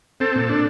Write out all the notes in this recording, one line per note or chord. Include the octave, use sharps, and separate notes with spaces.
C4 A4
A#2
D4